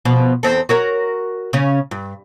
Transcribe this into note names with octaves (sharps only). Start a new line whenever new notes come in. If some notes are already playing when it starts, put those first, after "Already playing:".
B2 F3
E2 C4 A4
F#4 A#4 C#5
C#3 C#4
G2